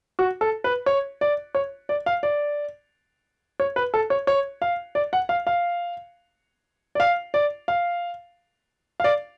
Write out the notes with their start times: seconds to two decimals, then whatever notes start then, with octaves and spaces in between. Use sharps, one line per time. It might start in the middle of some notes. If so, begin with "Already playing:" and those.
0.19 F#4
0.41 A4
0.64 B4
0.86 C#5
1.21 D5
1.55 C#5
1.89 D5
2.06 F5
2.23 D5
3.60 C#5
3.76 B4
3.94 A4
4.10 C#5
4.27 C#5
4.62 F5
4.95 D5
5.13 F#5
5.29 F5
5.47 F5
6.95 D5
7.00 F5
7.34 D5
7.68 F5
9.00 F5
9.04 D5